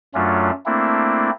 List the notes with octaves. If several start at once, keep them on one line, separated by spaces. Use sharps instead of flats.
F#2 F#3 A3 C#4 D4 F4
A3 A#3 C4 D4 E4